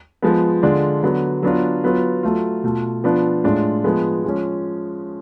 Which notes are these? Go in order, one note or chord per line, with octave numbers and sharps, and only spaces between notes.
F3 G#3 B3
D3 G#3 D4 F4
D3 F#3 B3
F#3 B3 D4 F4
F#3 B3 F4
F#3 A3 F4
B2 A3 F4
F3 B3 D4 F4
A2 G#3 D4 F4
F3 G#3 B3
F3 G#3 C#4